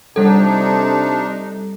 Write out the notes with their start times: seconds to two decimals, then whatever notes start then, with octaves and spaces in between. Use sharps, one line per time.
0.16 C3 G3 D4 D#4 A4